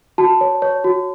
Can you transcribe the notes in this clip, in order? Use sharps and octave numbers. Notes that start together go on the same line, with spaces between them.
F#4 A5
C#5
C#5
F#4